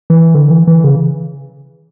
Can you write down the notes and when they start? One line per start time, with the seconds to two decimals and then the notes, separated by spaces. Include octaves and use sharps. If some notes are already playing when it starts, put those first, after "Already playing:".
0.10 E3
0.35 D3
0.51 E3
0.67 E3
0.84 C#3